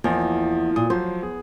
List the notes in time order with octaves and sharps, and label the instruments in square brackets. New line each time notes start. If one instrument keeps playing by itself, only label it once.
[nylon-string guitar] E2 [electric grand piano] F3 A#3
[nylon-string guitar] A#2 [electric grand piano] D#6
[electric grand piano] F3 F#3 [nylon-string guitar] C5
[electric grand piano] B3 G#4